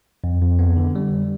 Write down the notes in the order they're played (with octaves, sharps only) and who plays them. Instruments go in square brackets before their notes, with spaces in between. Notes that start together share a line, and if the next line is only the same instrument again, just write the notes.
[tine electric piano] F2
F2
B3
D3
G3